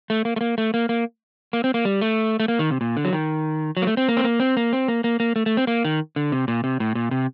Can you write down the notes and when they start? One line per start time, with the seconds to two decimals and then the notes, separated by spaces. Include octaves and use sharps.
0.10 A3
0.25 A#3
0.36 A3
0.41 A#3
0.58 A3
0.74 A#3
0.89 A#3
1.53 A#3
1.64 C4
1.74 A#3
1.85 G3
2.01 A3
2.40 A3
2.48 A#3
2.59 D#3
2.71 C3
2.81 A#2
2.97 D3
3.05 F#3
3.13 D#3
3.77 F#3
3.82 A#3
3.87 A3
3.97 C4
4.08 A#3
4.17 C4
4.24 A#3
4.40 C4
4.57 A#3
4.73 C4
4.88 A#3
5.04 A#3
5.20 A#3
5.36 A3
5.46 A3
5.57 C4
5.67 A#3
5.84 D#3
6.16 D3
6.32 C3
6.48 A#2
6.64 C3
6.80 A2
6.95 A#2
7.11 C3